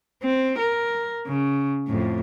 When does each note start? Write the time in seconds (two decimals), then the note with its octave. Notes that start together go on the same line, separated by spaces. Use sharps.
0.23 C4
0.59 A#4
1.27 C#3
1.88 F2 A2